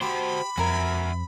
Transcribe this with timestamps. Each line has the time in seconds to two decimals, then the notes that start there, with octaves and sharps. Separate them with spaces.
0.01 F#4 G4 C5 B5
0.57 F2 F3 F#4 A#4 E5 G#5